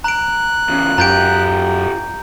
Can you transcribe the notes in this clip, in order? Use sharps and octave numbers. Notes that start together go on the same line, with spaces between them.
A#5 F#6 D7
E2 C#3
F#2 F4 G4 A#5 G6 D7